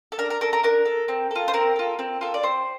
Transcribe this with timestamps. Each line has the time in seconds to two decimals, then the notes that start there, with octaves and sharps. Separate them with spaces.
0.12 A4
0.18 D4 A#4
0.30 A#4
0.41 A4 A#4
0.53 A#4
0.63 D4 A#4
0.86 A4
1.08 C4
1.31 F4 A4
1.48 C5
1.54 C4 A#4
1.76 F4 A4
1.99 C4
2.21 F4 A4
2.34 D5
2.43 C4 C5